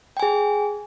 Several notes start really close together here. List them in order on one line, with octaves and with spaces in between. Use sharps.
G5 G#5 G#4